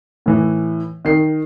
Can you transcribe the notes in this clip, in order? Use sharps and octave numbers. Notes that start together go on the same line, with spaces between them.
A2 E3
D#3 C7